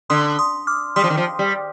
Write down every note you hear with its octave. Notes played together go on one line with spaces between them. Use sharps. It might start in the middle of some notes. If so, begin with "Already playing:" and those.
D3 C6 D#6
C6 D#6
D6 F6
G3 C6 D#6
F3
D#3
F3
G3